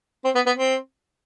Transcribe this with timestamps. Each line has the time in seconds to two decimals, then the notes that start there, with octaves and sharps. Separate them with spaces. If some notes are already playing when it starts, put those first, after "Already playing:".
0.25 C4
0.35 B3
0.46 B3
0.56 C4